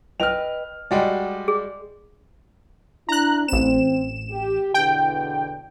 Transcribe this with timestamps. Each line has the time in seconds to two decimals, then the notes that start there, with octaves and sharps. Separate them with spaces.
0.20 B4 D#5 G5 F6 F7
0.91 G3 G#3 F#4 D5 F#5 G5
1.48 G#4
3.09 D4 E4 A#5 F#6
3.48 A1 C4 E7
4.30 G4
4.74 E2 B2 D3 G5